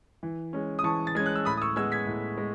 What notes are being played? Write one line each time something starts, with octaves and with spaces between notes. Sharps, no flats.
E3
G#3 C#4
D#6
E3 A5 C#6
A6
G#3 C#4 G#6
F#6
E6
A2 B5 D#6
D#6
C#6 E6
G#3 B3 E6 G#6
G#6 B6
A2
G#3